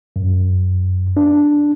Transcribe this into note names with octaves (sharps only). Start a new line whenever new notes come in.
F#2
D4